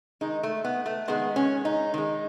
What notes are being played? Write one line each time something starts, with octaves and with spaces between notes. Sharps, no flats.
D#3 G#3 D#4
A3
B3
A3
D#3 G#3 B3
C#4
D#4
D#3 G#3